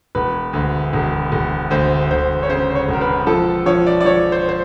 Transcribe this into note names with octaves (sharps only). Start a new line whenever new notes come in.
E1 B4
D2
E1
E1
D2 C5
D2 C5
C#5
C#3 C5
C5
C#5
E1 A#4
B4
F3 A4
F3 C#5
D5
D5
F3 C#5
C5
C5